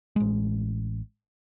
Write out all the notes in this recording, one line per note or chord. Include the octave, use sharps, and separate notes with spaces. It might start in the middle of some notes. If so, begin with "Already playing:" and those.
A1 G#3